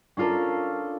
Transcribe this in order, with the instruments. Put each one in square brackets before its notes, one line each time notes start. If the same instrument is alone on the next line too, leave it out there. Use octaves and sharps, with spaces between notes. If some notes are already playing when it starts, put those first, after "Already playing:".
[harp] C#4 D4 F4 A4 A#4